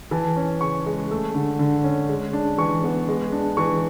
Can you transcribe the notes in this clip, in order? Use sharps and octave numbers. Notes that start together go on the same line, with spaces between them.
E3 A5
C#4
C#3 C#6
G#3
A3
D3
D3
C#4
G#3
D4
E3 C#6
B3
G#3
D4
E3 C#6